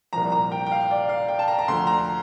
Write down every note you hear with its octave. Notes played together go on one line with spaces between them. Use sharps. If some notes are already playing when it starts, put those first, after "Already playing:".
C2 A#2 F3 A#5
A#5
G5
G5
F5
D5
F5
G5
A5
A#5
A#5
D2 D3 F3 C6
A#5